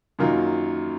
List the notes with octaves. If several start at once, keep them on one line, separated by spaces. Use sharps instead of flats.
F#2 D#3 F#3 A#3 F4